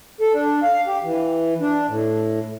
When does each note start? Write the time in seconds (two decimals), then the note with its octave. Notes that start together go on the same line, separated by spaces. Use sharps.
0.21 A4
0.33 D4
0.63 F5
0.87 G4
1.04 E3
1.61 D4
1.88 A2